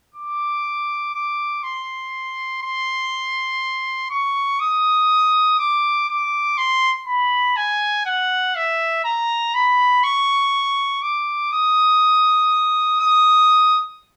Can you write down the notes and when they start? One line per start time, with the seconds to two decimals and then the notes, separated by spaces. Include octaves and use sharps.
0.15 D6
1.14 D6
1.63 C6
2.62 C6
4.10 C#6
4.60 D#6
5.59 D6
6.09 D6
6.58 C6
7.07 B5
7.57 G#5
8.06 F#5
8.56 E5
9.05 A#5
9.54 B5
10.04 C#6
11.02 D6
11.52 D#6
13.00 D#6